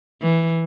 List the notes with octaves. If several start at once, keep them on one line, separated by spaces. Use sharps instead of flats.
E3